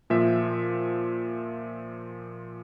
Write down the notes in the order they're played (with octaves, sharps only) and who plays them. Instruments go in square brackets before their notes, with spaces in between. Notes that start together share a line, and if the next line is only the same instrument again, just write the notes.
[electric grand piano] A#2 F3 E5